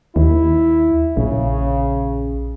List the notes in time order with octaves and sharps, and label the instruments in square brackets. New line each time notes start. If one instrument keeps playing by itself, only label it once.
[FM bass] D#2 [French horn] E4
[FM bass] A#1 [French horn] C#3